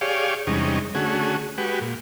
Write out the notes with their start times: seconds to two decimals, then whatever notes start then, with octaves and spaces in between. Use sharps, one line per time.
0.01 G4 G#4 C#5 D5 F5
0.47 E2 C3 G3 G#3 C#4 D#4
0.95 D3 A3 C#4 F#4 G#4
1.58 G#3 F#4 G4 B4
1.81 A#2